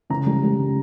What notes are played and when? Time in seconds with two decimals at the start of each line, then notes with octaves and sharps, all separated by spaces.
0.10 C#3 A#5
0.26 G3
0.44 G3
0.59 C#3